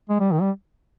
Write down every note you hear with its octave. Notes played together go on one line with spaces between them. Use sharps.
G#3
G3
D#3
G3